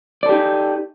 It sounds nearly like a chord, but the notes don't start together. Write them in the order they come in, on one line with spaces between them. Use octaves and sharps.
D5 A4 G4 D#4